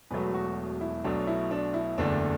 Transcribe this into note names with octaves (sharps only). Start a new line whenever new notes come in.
E1 E2 B2 F#3 A3 B4
F#4
E4
B1 B2 F#3 A3 D4
E4
D4
E4
F#1 E2 D3 A3 D4